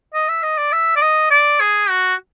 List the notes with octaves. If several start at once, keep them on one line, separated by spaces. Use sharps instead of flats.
D#5
E5
D#5
D5
E5
D5
D#5
D5
G#4
F#4